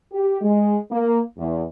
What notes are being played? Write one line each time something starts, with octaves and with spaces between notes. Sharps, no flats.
G4
G#3
A#3
E2